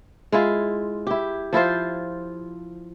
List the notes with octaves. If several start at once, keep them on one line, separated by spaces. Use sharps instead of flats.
G#3 E4 F4
E4 G4
F3 E4 F4 C5